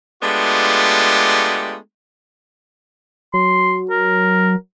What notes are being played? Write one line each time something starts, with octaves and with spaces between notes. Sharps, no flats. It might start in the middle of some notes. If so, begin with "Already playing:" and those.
G#3 A3 B3 D4 F4 G4
F#3 C6
A#4